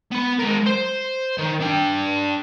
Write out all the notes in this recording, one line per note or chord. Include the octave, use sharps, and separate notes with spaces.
B3 B5
G#3 A#4
C5
D#3
D4 G5